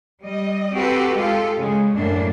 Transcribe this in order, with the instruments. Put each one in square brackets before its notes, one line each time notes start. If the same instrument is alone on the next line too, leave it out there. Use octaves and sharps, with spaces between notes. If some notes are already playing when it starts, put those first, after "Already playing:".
[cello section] G3 D#5
C4 F#4 G4 A4 B4
G#3 F4 G4 A4
C#3 G#3
F#2 A2 A#3 D4